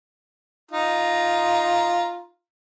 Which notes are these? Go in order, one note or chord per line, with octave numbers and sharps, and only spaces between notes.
D#4 F4 A#5